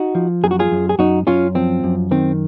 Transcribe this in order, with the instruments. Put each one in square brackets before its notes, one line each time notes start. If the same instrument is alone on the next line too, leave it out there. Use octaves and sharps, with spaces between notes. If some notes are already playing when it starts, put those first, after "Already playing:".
Already playing: [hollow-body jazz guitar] D#4 F#4
F3
F#2 G#4
F#4
F4 G#4
F#2
G#4
F#2 D#4 F#4
F#2 C#4 F4
F3 C4
F#2
D#3 C4